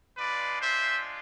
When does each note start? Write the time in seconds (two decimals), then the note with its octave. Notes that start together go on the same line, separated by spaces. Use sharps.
0.17 G#3 D4 F4 B4 D5
0.60 C5 E5